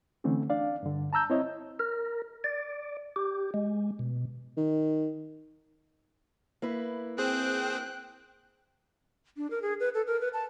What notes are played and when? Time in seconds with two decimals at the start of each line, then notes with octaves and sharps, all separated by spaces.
0.24 D3 E3 A3 C4 C#4
0.50 D4 D5 F5
0.83 G2 D3
1.13 A5 A#5 E6 G6
1.30 C4 E4 C#5 D#5
1.79 A#4
2.44 D5
3.16 G4
3.54 G#3
3.99 B2
4.57 D#3
6.62 A#3 E4 B4
7.18 C4 G#4 C5 G5 F#6
9.37 D4
9.51 A#4
9.62 G#4
9.80 B4
9.94 A4
10.07 A#4
10.21 B4
10.33 A5